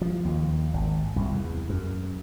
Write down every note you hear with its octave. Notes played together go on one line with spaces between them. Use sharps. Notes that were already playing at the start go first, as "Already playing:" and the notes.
F3
D#2
G#1
C2
E2
F#2